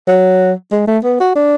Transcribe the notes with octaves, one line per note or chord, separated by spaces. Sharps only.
F#3
G#3
A3
B3
F#4
D4